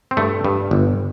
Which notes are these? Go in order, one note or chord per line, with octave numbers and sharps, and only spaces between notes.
C4
G2 A3
G2
G1